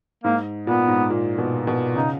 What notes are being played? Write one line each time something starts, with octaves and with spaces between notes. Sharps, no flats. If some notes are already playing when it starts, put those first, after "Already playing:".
G#2 A#3
A#2 B3
G#2
A#2
B2
B2
C#3 D#4